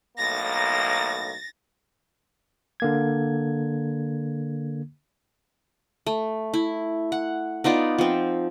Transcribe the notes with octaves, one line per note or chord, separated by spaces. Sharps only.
B1 A2 A#3 A6 A#6
D3 A#3 G#6
A3
E4
F#5
B3 D#4 F4 D5
F3 C4